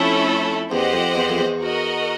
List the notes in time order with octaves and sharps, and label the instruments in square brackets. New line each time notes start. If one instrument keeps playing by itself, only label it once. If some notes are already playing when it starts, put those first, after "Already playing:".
Already playing: [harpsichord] F2 [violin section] A3 C#4 E4 A4
[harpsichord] E2 [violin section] G4 C5 D#5 F#5
[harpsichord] F2
E2
F2
E2
[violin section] F#4 A#4 D#5